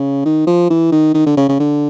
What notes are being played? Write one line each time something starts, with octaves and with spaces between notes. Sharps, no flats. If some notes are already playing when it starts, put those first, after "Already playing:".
Already playing: C#3
D#3
F3
E3
D#3
D#3
D3
C#3
C#3
D3